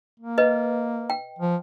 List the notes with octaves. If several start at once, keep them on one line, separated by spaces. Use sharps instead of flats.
A#3
B4 D#5
G5
F3